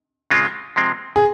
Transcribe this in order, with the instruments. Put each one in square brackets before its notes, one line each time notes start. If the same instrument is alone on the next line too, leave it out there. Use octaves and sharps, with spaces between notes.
[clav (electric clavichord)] C#3 G#3 C4 F4
C3 F3 G#3 C4
[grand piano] G#4